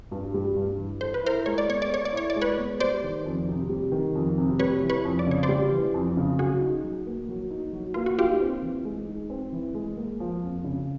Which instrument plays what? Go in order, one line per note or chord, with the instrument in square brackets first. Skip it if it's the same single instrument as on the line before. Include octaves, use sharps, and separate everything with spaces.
[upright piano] G2
G3
G2
E3
[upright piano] A4 [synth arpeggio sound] C5
[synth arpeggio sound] B4
[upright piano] E4 [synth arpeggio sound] A#4 C5
[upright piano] G#3 [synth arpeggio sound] C#5
[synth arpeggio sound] D5
[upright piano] B3 [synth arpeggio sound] C#5
[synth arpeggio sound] D5
[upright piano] A4 [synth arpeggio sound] C#5
[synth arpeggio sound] D5
[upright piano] E4 [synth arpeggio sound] C#5
[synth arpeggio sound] D5
[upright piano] G#3
[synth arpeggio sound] B4 C#5
[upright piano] B3
[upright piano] G3 [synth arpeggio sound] C5 D5
[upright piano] D#3
F2
C3
G3
D#3
F2
C3
[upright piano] G3 [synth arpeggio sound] B4 C#5
[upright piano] E3
[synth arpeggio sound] B4 C#5
[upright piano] F2
[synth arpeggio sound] D5
[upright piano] C#3 [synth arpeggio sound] C#5
[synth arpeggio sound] C5 D5
[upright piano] G3
E3
F2
C#3
[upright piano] F#3 [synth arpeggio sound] F#4 G#4
[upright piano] D#4
F#3
A#3
F#3
D#4
F#3
[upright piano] A#3 [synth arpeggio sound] F4
[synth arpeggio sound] F#4
[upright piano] D#4 [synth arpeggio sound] F4 G4
[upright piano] C4
E3
G#3
D#4
C4
E3
G#3
A#3
F3
F2
C#3